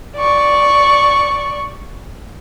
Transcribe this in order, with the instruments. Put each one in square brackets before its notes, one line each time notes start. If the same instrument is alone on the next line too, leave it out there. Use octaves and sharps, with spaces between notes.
[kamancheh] D5 C#6